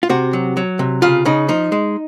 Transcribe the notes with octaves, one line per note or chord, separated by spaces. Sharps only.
F4
C3 F#4
F#3
F#3
C3
C#3 F4
C#3 D#4
F3 D#4
G#3